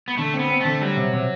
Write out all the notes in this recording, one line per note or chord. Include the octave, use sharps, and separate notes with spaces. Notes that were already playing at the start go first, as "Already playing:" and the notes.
B3
D3 A3
C4
B3
C4
D3 A3
F#3 G3
C3
C3